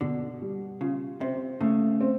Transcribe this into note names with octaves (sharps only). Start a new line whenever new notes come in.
B2 D3
G3
C#3 F4
C3 C4
C#3 A3
C4